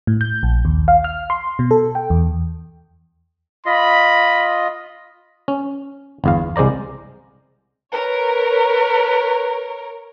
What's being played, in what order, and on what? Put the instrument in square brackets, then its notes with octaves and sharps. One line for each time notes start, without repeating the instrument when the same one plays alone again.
[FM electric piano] A2
G6
A#1
D#2
F5
F6
C6
B2
A4
G5
E2
[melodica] F4 D#5 [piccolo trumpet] B5
[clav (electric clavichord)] C#4
G1 E2 F5
C2 G#3 C5 D5 A#5
[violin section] A#4 C#5 [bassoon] B4